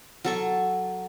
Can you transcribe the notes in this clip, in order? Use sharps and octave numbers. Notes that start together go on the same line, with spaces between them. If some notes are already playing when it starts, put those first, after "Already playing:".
F#3 A4 C#6